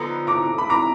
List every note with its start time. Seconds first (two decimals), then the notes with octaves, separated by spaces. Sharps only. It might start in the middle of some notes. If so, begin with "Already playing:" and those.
Already playing: D3 F3 B3 D#4
0.27 A#5 D6
0.58 B5
0.70 A#5 D6